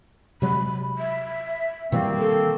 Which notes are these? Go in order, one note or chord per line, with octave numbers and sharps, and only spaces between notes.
C3 F#3 G#3 B5
E5
B2 D#3 E3 G3 A#3 C4
A4